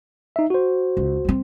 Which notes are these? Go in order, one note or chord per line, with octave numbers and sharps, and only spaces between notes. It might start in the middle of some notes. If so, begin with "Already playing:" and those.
D#4 E5
F#4 C5
C#2
G3 C4